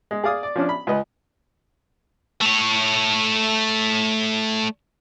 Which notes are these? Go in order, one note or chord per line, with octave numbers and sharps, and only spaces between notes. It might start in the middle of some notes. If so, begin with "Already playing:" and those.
G#3
G#4 D5 F5 D#6
D5
F3 C#4 D4
B5
C#2 B4 D#5
A3 C#5